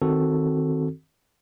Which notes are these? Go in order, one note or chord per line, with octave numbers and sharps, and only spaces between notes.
D#3 C4 F#4 A4